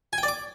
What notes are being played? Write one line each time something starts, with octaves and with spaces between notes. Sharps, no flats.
G#5
G5
D5
D6